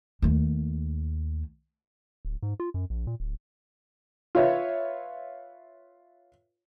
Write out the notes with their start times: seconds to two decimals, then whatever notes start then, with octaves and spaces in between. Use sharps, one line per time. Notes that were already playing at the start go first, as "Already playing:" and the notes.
0.22 D#2 A3
2.25 D1
2.43 G#2
2.60 F4
2.74 F#2
2.90 A#1
3.07 A#2
3.20 D1
4.35 F4 B4 C#5 E5